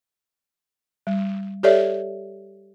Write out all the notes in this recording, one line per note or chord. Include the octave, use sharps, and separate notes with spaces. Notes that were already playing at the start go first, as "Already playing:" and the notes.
G3
G4 A4 C#5 D5 E5